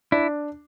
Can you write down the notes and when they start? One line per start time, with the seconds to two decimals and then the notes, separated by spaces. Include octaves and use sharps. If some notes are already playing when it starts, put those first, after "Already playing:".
0.12 D4 E4